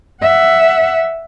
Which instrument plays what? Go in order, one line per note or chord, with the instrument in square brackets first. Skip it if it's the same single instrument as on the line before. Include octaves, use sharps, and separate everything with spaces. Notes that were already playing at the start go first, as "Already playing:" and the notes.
[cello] E5 F#5